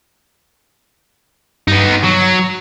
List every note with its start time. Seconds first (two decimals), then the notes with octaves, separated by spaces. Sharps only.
1.68 G2 B3 D#4
2.03 F#3